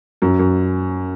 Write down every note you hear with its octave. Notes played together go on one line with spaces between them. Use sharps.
F#2
F#2